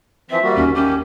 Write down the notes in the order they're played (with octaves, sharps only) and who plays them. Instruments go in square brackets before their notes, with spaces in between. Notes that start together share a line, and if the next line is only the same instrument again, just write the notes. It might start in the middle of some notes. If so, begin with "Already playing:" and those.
[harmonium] E3 F3 C4 [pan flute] E5
[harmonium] G3 A#3 F#4
[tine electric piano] G1 D#2 [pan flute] C#4
[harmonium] D#3 A#3 G4 [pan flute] C#4